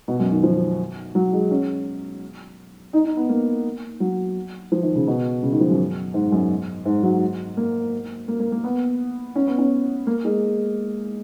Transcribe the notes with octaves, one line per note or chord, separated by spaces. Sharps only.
B2
F#2
D#3
F3
F#3
G#3
C#4
D#4
D#4
B3
A#3
F#3
F3
D#3
C#3
B2
C#3
D#3
F3
F#2
G#2
F#2
G#2
F#3
A#3
A#3
A#3
A#3
B3
C#4
B3
C#4
A#3
G#3